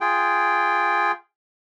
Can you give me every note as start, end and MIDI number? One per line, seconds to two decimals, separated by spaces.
0.01 1.12 65
0.01 1.12 68
0.01 1.12 79